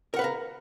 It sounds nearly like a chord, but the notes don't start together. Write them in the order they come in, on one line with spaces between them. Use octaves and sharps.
A#4 F#5 B4 F5 A#5